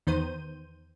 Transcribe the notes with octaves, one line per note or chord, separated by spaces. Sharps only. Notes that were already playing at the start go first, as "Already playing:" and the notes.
E2 D#3 B3 C5 G6 D#7